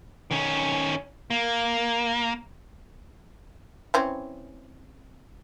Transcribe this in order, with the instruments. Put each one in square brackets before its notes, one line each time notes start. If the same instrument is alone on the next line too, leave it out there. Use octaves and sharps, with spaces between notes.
[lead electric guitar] D#3 C#4
A#3
[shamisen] E3 C4 C#4